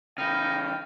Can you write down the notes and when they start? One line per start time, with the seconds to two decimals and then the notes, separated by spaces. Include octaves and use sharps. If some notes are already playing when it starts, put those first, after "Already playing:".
0.18 C#3 E3 D#4 G5 F6